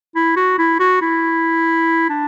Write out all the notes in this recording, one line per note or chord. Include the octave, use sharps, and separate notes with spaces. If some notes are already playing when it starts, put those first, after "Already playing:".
E4
F#4
E4
F#4
E4
D4